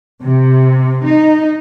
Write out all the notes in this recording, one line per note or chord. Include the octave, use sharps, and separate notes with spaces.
C3
D#4